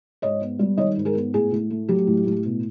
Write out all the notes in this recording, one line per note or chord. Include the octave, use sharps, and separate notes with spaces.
G#2 C#5 D#5
B3
G3
D#3 C#5 D#5
G#2
G#4 A#4
B3
A2 G#4
A2
A3
F#3 G4
A2
A2
B2